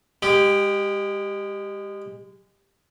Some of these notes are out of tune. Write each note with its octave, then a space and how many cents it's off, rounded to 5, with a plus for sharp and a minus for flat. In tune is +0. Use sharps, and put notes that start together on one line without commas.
G#3 -25 G4 +0